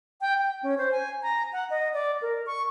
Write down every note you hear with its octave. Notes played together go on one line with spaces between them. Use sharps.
G5
G5
C#4
C5
G#5
A#5
F#5
D#5
D5
A#4
C#6